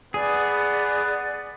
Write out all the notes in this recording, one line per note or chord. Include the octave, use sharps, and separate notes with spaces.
B3 G#4 D5